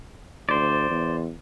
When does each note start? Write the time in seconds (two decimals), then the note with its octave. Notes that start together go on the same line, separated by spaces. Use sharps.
0.49 D2 C5 D5
0.90 E2